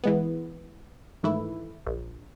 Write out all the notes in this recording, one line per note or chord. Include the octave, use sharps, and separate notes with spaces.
E3 G#3 B3
G#2 D#3 E3 A3 E4
A#1